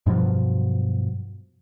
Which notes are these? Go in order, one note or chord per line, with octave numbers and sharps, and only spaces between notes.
G2 B2 F3 F#3